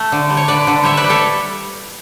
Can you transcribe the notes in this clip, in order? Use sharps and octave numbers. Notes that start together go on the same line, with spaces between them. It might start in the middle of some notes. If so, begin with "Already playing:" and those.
Already playing: A3
D3
G3
C#5
D3 B4 D5
D3
G3 C#5 E5
B4 D5
G3
A4 C#5